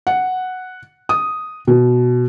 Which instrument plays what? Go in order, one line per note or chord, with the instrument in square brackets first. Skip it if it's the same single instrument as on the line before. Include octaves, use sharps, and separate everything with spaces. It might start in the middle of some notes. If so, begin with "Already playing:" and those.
[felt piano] F#5
D#6
B2